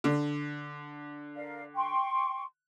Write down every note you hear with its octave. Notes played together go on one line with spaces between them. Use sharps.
D3
A#4 D5 F5
G5 C6 C#6